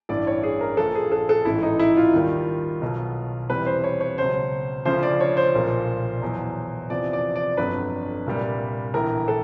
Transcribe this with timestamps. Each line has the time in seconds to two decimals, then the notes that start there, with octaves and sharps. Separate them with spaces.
0.09 A1 G2 E3 D5
0.27 C#5
0.43 G#4
0.61 A#4
0.77 A#1 A#2 F3 A4
0.95 G#4
1.12 A4
1.29 A4
1.45 A1 G#2 E3 E4
1.63 D#4
1.79 E4
1.97 F4
2.14 D#2 D#3 G3
2.82 B1 B2 F#3
3.49 E2 C3 E3 G3 B4
3.66 C5
3.84 C#5
4.01 C#5
4.18 C#2 B2 F#3 C5
4.85 D2 C#3 F3 C5
5.03 D5
5.20 C#5
5.37 C5
5.54 B1 A#2 F3
6.22 E2 B2 F#3
6.90 E2 C3 F3 D5
7.13 D5
7.36 D5
7.57 G1 F2 D3 F#3 B4
8.26 C2 A#2 G3
8.94 A#1 A2 E3 A#4
9.28 A4